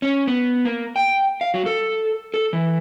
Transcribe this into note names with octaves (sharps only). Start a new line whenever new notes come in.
C#4
B3
A#3
G5
F5
F#3
A4
A4
E3